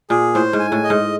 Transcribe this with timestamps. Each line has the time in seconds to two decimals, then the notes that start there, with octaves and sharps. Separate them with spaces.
0.10 A#2 G#4
0.35 A2 C5
0.53 G#2
0.59 G#5
0.72 A2
0.84 D#5
0.90 G#2